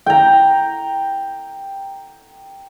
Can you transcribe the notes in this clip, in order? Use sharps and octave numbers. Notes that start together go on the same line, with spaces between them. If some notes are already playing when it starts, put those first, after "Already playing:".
G5 A#5